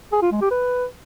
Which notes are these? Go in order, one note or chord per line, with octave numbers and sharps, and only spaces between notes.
G#4
F4
G#3
G4
B4